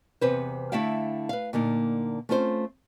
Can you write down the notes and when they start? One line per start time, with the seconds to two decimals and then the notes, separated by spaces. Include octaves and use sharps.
0.21 E2 C3 B4 C5
0.72 D3 A3 E4 E5 F5 G5
1.29 B4 F5
1.53 A#2 D3 A#3 D#4
2.29 A3 C4 C#4 F4 B4 C5